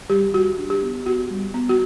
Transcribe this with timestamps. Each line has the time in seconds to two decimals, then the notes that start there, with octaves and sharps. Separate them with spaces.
0.10 G3 G4
0.34 G3 F#4
0.58 D4
0.70 G4
0.83 B3
1.06 B3 F#4
1.30 G3
1.54 B3
1.69 F#4